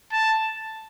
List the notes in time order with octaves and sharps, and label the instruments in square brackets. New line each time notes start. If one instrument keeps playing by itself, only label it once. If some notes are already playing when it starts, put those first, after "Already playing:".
[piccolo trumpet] A5